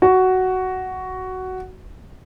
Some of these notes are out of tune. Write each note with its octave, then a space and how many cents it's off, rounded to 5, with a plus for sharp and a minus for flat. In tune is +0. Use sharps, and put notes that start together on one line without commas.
F#4 +10